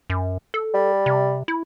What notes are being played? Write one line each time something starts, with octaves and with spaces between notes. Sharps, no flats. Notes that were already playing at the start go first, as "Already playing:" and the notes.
F#2
A4
G3
C3
E4